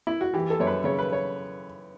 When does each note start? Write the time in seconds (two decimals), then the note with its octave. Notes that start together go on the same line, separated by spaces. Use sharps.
0.07 E4
0.21 F#4
0.34 E3 G4
0.50 A4
0.60 F#2 C#5
0.67 B4
0.84 C#3 C#5
0.99 B4
1.12 C#5